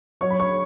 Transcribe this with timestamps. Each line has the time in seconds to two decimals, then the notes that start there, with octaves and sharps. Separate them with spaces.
0.21 F#3 C#5 C#6
0.30 B5
0.40 C#5 C#6